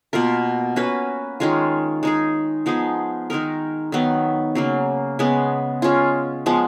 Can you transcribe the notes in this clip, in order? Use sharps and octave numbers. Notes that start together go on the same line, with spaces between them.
B2 A#3 F4 A#4
A#3 C#4 F#4 B4
D#3 G#3 C#4 F4
G#3 D#4 G#4
F3 B3 D#4 G#4
D#3 G#3 D#4 A#4
D#3 F#3 B3
C#3 F#3 A#3
C#3 G#3 B3
G#3 C#4 F4
F3 G#3 B3